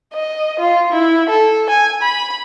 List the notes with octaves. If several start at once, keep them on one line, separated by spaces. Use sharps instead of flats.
D#5
F4
E4
A4
G#5
B5